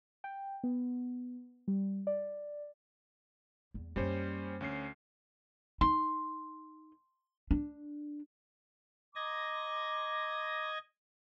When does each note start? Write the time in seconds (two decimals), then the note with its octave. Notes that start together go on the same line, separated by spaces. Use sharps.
0.24 G5
0.64 B3
1.68 G3
2.07 D5
3.74 E2 G3
3.96 F#2 G3 A#3 C#4 C5
4.61 D2 C#4 C7
5.81 D#4 C6
7.51 D4
9.15 D#5 A#5 C6 D6 G#6 A#6